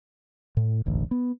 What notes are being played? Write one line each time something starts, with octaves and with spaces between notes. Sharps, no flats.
A2
E1 A1 D2
B3